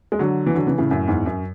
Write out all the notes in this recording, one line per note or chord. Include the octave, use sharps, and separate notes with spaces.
G#3
D3 F#3
E3
D3 F#3
C#3 E3
A2 C#3
F#2 A2
E2 G#2
F#2